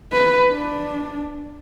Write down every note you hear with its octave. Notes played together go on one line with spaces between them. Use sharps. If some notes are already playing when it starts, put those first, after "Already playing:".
B4
D4